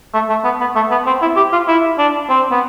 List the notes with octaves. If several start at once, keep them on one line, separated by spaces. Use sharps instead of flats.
A3
A3
B3
B3
A3
B3
C4
E4
G4
F4
E4
D4
C4
B3